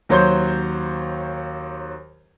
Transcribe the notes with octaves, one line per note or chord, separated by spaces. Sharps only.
D#2 F#3 C5 C#5 C6 G6